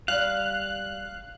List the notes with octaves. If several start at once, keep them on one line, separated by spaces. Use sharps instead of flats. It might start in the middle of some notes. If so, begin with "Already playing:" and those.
G3 F5 F#6